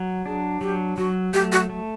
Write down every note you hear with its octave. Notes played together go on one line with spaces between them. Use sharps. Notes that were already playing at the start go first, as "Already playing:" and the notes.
Already playing: F#3
D4 G#4
F#3 G4
F#3 F#4
A3 G4
F#4
A3